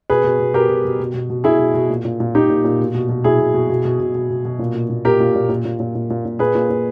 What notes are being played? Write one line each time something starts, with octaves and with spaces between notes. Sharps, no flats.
B2 G#4 B4
B2
B2
B2 G4 A#4
B2
B2
B2
B2
B2
B2 E4 G#4
B2
B2
A#2
A#2
A#2
A#2 D#4 G4
A#2
A#2
B2
B2
B2
B2 E4 G#4
B2
B2
B2
B2
B2
B2
B2
B2
A#2
A#2
A#2
A#2 G4 A#4
A#2
A#2
A#2
A#2
A#2
A#2
A#2
A#2
A#2 G#4 B4
A#2
A#2